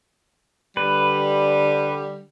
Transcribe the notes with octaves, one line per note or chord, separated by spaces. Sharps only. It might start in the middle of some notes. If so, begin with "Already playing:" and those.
D3 G3 B4